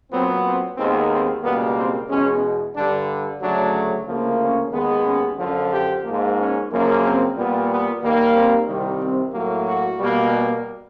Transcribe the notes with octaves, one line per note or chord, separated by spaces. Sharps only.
A#2 F#3 B3 C4
C4
D#2 D#3 G#3 B3 C4
C4
C#2 B2 G3 A#3 B3
C4
E2 B2 G#3 C#4
G2 D3 G3 D4
D2 C#3 F#3 A3 D4
D2 C#3 F3 A#3
C#4
D#2 D#3 G#3 B3
C#4
F#2 D3 F3
G4
G#2 F3 A#3
C#4
F#2 C#3 F3 A#3
C4
A#2 G3 B3
B3
D#2 D#3 G3 A#3
C4
C2 C3 D#3 G3
C4
A2 F#3 A#3
F#4
B2 G3 A#3